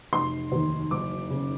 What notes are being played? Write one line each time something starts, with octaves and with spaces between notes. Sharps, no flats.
F1 C6
D#2 D#3
F#1 D6
C#3